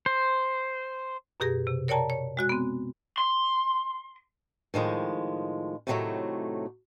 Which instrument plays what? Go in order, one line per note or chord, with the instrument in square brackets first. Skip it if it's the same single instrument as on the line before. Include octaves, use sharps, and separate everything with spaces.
[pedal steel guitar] C5
[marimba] F#2 B2 G4 G#4 A#6
C3
A#4 C#5 D5 G5 A5 A#5
C#5
G#3 F#4 F#6
B3 C4
[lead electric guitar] C6
[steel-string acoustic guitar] A2 D#3 F3 G#3
A2 C3 D#3 F3 F#3 A3